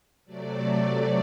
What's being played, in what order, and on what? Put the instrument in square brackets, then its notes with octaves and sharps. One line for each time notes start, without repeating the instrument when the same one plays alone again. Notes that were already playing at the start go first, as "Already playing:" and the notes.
[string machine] C3 F#3 A3 D5